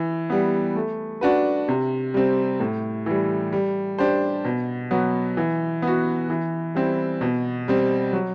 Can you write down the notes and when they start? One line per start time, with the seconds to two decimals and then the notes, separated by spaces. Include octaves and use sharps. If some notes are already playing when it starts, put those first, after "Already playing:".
Already playing: E3
0.30 G3 B3
0.75 A3
1.21 D4 F#4 B4
1.68 C3
2.14 G3 C4
2.60 A2
3.06 E3 G3
3.53 G3
3.99 D4 G4 C5
4.45 B2
4.91 F#3 B3
5.37 E3
5.82 B3
5.87 F#4
6.30 E3
6.75 G3 C4 E4
7.21 B2
7.68 G3 C4
8.13 F#3